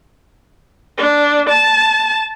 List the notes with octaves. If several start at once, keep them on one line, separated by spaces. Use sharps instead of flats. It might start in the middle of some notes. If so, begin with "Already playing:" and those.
D4
A5